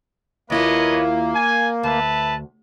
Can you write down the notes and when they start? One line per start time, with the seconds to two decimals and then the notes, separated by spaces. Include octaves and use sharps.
0.50 D#2 A#3 E4 F4 B4 C#5 D#5
1.34 G#5
1.83 D2 B4 E5 A5